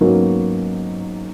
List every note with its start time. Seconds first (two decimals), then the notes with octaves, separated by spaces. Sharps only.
0.01 G#2 F#3 A#3 B3 C#4